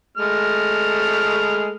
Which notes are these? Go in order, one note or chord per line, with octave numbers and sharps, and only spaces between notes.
G#3 A3 F6